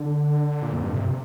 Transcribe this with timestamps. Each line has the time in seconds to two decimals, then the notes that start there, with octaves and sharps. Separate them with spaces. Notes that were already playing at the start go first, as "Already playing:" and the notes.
Already playing: D3
0.62 A#2
0.73 F2
0.83 G2
0.94 C3